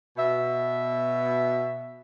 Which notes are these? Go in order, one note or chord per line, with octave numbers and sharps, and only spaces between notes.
B2 E5